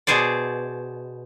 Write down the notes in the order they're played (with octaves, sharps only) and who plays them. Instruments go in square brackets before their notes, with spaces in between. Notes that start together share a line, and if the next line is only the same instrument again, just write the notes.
[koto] B2 G#4 C5 D5